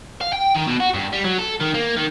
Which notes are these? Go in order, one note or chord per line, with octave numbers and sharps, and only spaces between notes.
F5
G5
D#3
B2
F#4
G2
G3
F#3
A4
D#3
A#3
D#3